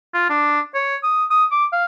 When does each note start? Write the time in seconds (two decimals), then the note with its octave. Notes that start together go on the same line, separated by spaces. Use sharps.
0.14 F4
0.29 D4
0.74 C#5
1.03 D#6
1.30 D#6
1.51 D6
1.72 F5